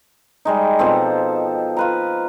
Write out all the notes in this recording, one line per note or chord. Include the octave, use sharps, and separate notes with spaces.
G3 G#3 D#4
B2 F3 C4 A4
F4 B4 A#5